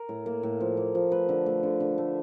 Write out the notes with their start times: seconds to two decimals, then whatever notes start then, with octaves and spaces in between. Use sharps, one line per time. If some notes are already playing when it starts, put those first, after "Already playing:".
Already playing: A#4
0.09 A2
0.26 A#3
0.43 A2
0.60 F3
0.77 A#3
0.95 F3
1.11 A3 B4
1.29 D3
1.46 A3
1.63 D3
1.80 D3
1.98 A3